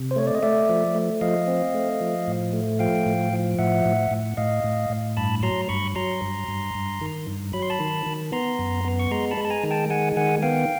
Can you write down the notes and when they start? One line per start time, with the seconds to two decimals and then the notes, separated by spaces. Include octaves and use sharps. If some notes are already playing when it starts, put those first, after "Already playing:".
Already playing: C3
0.11 C5
0.16 A3 C#5
0.27 D5
0.35 D#5
0.43 A3 D5 E5
0.69 F3
0.95 A3
1.21 F3 D#5 F5
1.48 C4
1.74 A3
2.01 F3
2.28 A2
2.53 A3
2.79 F3 F5 G5
3.06 A2
3.33 F3
3.58 A2 E5 F#5
3.86 A2
4.11 A2
4.37 A2 D#5 F5
4.64 A2
4.90 A2
5.17 G2 A5 B5
5.43 F#3 A#5 C6
5.69 G2 B5 C#6
5.95 F#3 A#5 C6
6.21 G2
6.48 G2
6.75 G2
7.01 D#3
7.27 G2
7.53 F#3 B5
7.62 C6
7.70 A5 B5
7.80 D#3
8.06 D#3
8.32 B3 A#5 C6
8.59 F#2
8.85 B3
8.99 C#6
9.11 G#3 A#5 C6
9.31 A5 B5
9.37 G#3
9.45 A5
9.50 G#5 A#5
9.63 D#3
9.71 G5 A5
9.90 G#3 F#5 G#5
10.17 D#3 F#5 G#5
10.42 B3 F5 G5